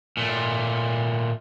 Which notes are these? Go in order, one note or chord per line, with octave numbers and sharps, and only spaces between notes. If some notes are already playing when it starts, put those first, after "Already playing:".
A#2 A3